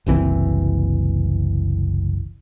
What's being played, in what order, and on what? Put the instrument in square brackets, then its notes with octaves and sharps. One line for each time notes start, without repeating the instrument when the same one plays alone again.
[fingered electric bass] F#1 C2 E3 C4